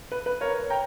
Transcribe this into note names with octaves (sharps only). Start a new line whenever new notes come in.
B4
B4
A#4 C#5
G5 A#5